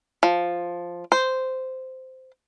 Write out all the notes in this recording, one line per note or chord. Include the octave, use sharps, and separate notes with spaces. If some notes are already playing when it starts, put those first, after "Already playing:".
F3
C5